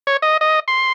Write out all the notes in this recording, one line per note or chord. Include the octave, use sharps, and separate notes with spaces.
C#5
D#5
D#5
C6